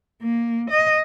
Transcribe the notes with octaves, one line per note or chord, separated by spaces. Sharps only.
A#3
D#5